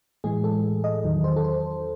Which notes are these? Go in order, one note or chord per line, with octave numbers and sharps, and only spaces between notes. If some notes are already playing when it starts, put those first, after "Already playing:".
A2 E3 G#3 G#4
A4
D#5
E2 D#3 F#3
C5
A4
C5